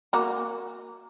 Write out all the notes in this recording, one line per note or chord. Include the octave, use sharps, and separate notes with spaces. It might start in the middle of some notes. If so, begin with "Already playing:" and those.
A#3 F#4 A#5